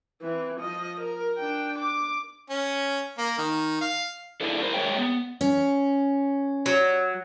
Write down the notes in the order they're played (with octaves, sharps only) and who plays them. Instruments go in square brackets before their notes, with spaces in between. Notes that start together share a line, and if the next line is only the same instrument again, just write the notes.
[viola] E3 C4
F3 D#5
A#4
D4 G5
D6
[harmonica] C#4
A#3
D#3
F5
[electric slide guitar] D4 E4 G#4 A4
A#4 C5
G#3 G#4 C#5 G5
B3
[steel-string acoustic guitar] C#4
[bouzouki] F#3